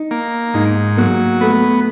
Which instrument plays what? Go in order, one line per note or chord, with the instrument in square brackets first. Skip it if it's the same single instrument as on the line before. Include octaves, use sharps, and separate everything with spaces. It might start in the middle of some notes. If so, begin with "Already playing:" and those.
Already playing: [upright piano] D#4
[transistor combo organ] A#3
[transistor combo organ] G#2 [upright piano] D#4
[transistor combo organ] F#3 [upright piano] A#3
[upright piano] A3 [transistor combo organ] B3